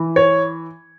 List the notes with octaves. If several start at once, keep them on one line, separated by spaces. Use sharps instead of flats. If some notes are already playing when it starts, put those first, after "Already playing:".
Already playing: E3
C#5